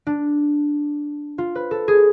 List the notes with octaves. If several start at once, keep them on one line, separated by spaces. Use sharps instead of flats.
D4
F4
B4
A4
G#4